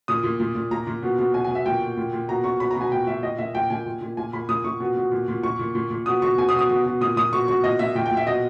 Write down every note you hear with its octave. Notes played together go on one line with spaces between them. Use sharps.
A#2 D#6
A#2
A#2
A#2
A#2 A#5
A#2
B2
B2
B2 G#5
B2 G#5
E5
A#2 G5
A#2
A#2
A#2
B2 A#5
B2 C#6
B2 B5
A#5
B2 G#5
A#2 G5
A#2 E5
A#2 D#5
A#2 E5
A#2 G5
A#2 G#5
A#2
A#2
A#2 G#5
A#2 B5
A#2 D#6
A#2 C#6
B2
B2
A#2
A#2
A#2 C#6
A#2
A#2
A#2
B2 D#6
B2 C#6
B2 G#5
D#6
B2
D#6
B2
B2
A#2 D#6
A#2 D#6
B2 C#6
B2 C#6
A#2 D#5
A#2 E5
A#2 G5
G5
A#2
E5
B2 D#5